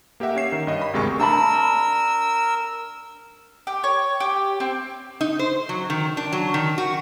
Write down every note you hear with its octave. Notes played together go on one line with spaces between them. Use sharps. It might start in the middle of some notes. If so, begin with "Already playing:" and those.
A#3 G4 A#4 E5 F#5
C#4 C#5 C7 E7
D#3
G2 D#5
B5
G#1 D2 C3 G#3 A#4 C#6
D4 A#4 A5 B5 E6
G4
C#5
G4
C4
D#4
C5
F#3
D#3
D4
F#3
D#3
F#4